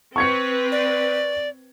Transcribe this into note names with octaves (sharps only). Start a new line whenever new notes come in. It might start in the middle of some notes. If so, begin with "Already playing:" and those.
C4 B4 C#6 G#6 C#7
D5